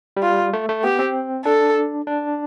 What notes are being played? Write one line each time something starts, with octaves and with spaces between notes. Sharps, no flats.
G3
F4
A3
A3
B3 G4
C4
D4 A4
D4